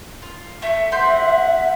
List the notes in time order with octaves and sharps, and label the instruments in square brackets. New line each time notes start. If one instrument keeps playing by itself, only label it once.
[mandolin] F4
[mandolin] A3 [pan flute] E5
[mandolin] C4 C6 G6 [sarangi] F#5